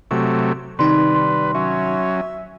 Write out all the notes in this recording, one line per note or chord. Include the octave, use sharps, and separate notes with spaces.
C3 F#3 A3 C#6
C3 D#3 G3 D#4 B4 C6
C6
F#3 C#4 E5